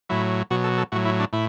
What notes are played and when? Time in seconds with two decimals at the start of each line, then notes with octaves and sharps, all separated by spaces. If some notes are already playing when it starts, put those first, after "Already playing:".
0.09 A2 F#3 E4
0.50 B2 F#3 F#4
0.64 A4
0.78 A4
0.92 A2 F#3 F#4
1.05 E4
1.20 D4
1.33 A2 E4